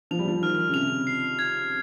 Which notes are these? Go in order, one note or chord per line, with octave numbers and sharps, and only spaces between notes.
F3 F7
G3
F3
D#3 F6
C#3
C3 F7
C7
G#6